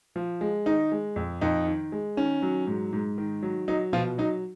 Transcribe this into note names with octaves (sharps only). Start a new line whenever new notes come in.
F3
G#3
D#3 D#4
G#3
F2
F2 D#4
D#3
G#3
D#3 C#4
F#3
G#2
G#2
D#3
F#3
F#3 D#4
B2 F3 F4
F#3 D#4